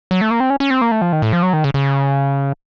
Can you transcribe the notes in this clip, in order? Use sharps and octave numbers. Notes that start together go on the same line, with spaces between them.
F#3
A3
A#3
C4
C#4
C#4
C4
A#3
A3
F3
D#3
A2
F3
F#3
D#3
C#3
C#3